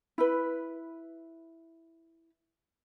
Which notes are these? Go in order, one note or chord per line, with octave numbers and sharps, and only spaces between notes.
E4 B4